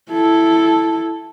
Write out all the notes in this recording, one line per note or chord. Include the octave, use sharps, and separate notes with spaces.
E4 A4